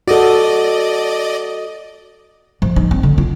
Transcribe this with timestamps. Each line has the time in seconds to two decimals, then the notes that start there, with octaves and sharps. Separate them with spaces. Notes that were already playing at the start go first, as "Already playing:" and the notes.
0.07 F#4 A4 D5 D#5
2.62 F3
2.76 D#4
2.91 C4
3.03 D3
3.18 F4